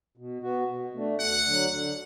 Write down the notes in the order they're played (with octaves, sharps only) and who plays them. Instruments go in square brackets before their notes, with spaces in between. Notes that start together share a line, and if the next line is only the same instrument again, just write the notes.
[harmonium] B2
B3 F#4
B2
A3 D4
[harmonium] D2 [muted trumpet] F#5
[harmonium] D3
F#3
D3